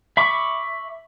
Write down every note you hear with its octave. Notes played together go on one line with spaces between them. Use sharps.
E5 B5 C#6 D6